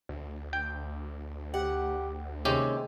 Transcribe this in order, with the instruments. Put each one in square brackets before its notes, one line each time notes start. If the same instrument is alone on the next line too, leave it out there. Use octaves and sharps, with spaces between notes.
[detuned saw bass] D2
[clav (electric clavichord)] G5
[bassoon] G4 [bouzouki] F#5
[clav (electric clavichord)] D#2 C#4 G4 [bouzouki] C3 [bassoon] G#3